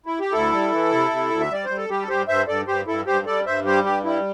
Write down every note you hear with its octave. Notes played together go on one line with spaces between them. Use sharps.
E4
G4
D2 E4 A4
G3
E3
C3
C3
D2
E5
G3 D5
G3 C5
A4
G3 G4
A4
G2 G4 C5
G2 C5 E5
G2 A4 D5
G2 G4 C5
G2 E4 A4
G2 G4 C5
G3 A4 D5
G2 C5 E5
G3 G4 C5
G2 G4
G3 E4